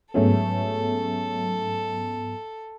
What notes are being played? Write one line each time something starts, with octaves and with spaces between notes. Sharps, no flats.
G#2 F#3 A3 B3 C#4 G#4 A4